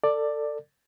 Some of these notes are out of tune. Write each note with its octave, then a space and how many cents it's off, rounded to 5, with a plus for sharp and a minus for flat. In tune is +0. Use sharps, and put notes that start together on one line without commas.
A4 +25 D5 +10